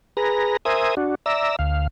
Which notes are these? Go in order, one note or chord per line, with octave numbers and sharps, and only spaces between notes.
G#4 B4 A#5
A#4 C5 E5 G#5 D#6
D4 F#4
D5 E5 A#5 E6
D2 F5